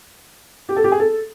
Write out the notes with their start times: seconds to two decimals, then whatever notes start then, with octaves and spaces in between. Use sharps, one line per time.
0.69 G4
0.76 A4
0.84 G4
0.92 G#4
0.99 A4